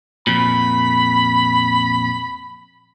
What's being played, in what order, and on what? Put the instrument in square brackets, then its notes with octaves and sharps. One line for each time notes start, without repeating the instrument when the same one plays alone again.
[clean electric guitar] F2 A#2 [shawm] B5